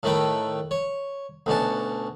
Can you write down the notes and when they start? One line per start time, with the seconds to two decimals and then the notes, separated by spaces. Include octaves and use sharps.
0.03 A2 D#3 A3 B4 G5
0.71 C#5
1.46 D2 B2 C#4 A5